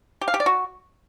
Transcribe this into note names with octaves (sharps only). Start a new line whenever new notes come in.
G4
F5
G4
D5
F#4